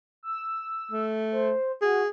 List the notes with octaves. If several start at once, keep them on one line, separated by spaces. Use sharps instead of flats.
E6
A3
C5
F#4 G#4